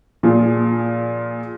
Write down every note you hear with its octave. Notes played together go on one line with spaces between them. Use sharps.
A#2 F3 F4 G#4